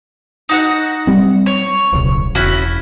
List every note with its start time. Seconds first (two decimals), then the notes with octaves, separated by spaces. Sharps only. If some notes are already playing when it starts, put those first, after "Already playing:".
0.49 D#4 F#4 F#5
1.07 G3 C4
1.46 C#5
1.93 D1 B1 C#3
2.35 E1 C#4 E4 F#4